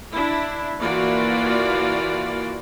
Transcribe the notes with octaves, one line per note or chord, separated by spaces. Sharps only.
D4 E4
E3 A#3 F4 F#4 D5